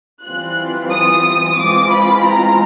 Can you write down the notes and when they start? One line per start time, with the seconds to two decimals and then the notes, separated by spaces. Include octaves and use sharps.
0.23 E3 G3 C4 F4 F#6
0.91 D#6
1.58 E3 G#3 C4 F4 D6
1.93 B5
2.25 A#5